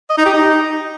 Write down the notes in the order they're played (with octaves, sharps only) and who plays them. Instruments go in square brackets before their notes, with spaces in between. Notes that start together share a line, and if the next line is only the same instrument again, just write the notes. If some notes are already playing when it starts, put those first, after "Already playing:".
[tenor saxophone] D#5
D#4
G4
D#4